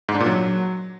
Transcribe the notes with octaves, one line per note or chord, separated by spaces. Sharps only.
G#2
D4
A#2
F#3